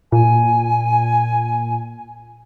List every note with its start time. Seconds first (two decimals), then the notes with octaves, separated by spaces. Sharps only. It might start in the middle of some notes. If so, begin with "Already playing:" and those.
0.12 A#2 G#5